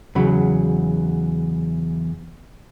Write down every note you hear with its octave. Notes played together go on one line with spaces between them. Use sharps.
E2 C#3 F#3 B5